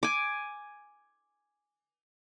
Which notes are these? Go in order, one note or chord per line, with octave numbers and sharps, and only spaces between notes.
G#5 D6